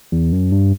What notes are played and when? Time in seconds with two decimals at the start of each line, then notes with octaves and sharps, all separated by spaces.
0.12 E2
0.32 F#2
0.52 G2